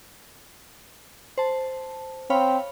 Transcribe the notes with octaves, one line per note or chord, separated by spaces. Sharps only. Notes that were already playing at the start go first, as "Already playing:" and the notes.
C5 A5
C4 C#5 F5 B5